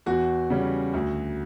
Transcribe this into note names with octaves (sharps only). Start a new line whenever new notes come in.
E2 F#4
C#3 G3 C#4
D2